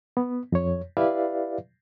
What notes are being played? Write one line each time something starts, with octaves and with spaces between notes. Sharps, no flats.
B3
F2 C#5
E4 G4 B4 D5 E5 F5